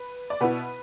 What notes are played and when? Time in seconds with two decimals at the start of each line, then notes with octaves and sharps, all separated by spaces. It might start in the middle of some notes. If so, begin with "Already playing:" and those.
Already playing: B4
0.30 D5
0.40 B2 B3 E4 B4